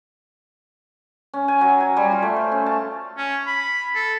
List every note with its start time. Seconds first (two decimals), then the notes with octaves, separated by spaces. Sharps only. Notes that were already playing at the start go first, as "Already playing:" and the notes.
1.33 C#4
1.48 G#5
1.61 F#3
1.80 G#5
1.97 G3
2.11 F4
2.22 A3
2.36 C5
2.52 C#4
2.66 A5
3.17 C#4
3.47 B5
3.95 A4